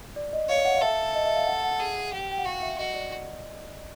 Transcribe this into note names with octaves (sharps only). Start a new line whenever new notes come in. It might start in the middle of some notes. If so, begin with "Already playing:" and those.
D5
D#5
C#5 F5
F#5
F5
A4 E5
D#5
E5
F5
F#5
F#5
G#4
G4
G5
F#5
F#4 F5
E5
F#4 D#5
D5